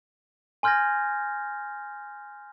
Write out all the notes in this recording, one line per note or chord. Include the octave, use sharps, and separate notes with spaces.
G#5 C6 F6 G6 G#6 A#6